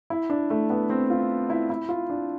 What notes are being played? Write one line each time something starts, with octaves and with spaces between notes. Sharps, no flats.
E4
D4
A3
B3
C4
F4
E4
E4
F4
D4